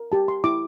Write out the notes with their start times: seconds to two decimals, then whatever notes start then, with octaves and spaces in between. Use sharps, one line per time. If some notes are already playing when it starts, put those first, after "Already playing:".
Already playing: A#4
0.12 G4 A5
0.28 C6
0.44 E4 D6